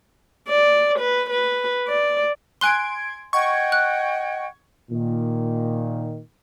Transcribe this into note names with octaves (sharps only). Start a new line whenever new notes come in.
D5
B4
B4
D5
G#5 C6 F#6 G#6 D7 G7
D#5 F#5 G5 C#6 G#6
F#6
A#2 D#3